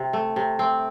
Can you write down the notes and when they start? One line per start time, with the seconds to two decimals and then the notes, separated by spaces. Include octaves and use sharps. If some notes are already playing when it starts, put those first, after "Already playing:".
Already playing: C3
0.13 A3
0.36 C3
0.59 C4